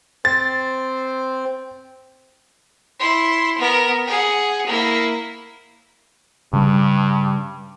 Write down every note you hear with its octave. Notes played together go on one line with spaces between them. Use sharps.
C4 C5 A6
E4 C6
B3 A#4
G#4 F#5
A#3 E4
G2 C#3 G3